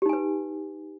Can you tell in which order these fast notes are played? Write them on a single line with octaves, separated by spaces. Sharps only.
G4 D#4 G#5 B4